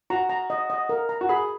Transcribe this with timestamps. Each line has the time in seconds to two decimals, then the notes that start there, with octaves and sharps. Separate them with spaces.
0.10 F#4 A#5
0.29 A#5
0.50 D#5
0.70 D#5
0.89 A#4
1.09 A#5
1.21 F#4
1.29 G#4 B5